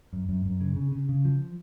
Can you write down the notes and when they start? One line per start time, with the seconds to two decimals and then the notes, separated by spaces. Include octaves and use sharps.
0.13 F#2
0.29 F#2
0.45 F#2
0.61 C#3
0.76 C#3
0.92 C#3
1.09 C#3
1.25 F3